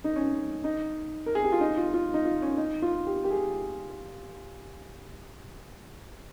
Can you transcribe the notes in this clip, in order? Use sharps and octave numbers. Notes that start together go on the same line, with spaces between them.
D#4
C#4
D#4
A#4
G#4
G4
F4
D#4
F4
F4
D#4
F4
C#4
D#4
F4
G4
G4
G#4